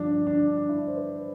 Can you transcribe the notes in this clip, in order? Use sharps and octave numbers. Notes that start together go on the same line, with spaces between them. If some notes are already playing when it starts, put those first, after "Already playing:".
Already playing: G2 D3 F3 D4
D4
D4
E4
C5
B4